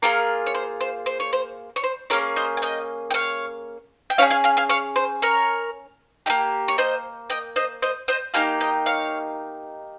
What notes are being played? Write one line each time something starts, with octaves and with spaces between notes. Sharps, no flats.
A#3 F4 G#4 A#4 C#5
C#5
C5
C5
C5
C#5
C5
C#5
C5
A#3 C#4 G#4 A#4 C#5
C5 D#5
G#5
D#5 G5
G5
C#5 F5
G5
C#4 F4 G#4 C#5 F5
F5 G#5
F5 G#5
F5 G#5
C#5 F5
C5
A#4 C#5
A#3 D#4 G4
C#5
C5 D#5
D#5 G5
C5 D#5
C5 D#5
C5 D#5
A#3 D#4 G4 F5 G#5
D#5 G5
C#5 F5